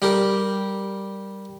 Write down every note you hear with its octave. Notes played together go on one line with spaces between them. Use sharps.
G3 G4 A#4